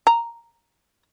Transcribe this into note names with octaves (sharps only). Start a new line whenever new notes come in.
A#5